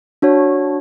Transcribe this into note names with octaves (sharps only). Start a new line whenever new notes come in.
D4 F#4 C#5